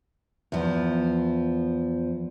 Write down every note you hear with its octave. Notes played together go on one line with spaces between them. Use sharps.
E2 F3